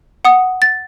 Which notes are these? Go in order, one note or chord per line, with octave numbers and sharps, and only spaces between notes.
F#5 D#6
A6